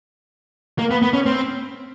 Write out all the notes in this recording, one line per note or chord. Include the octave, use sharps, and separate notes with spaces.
A#3
B3
B3
C#4
C4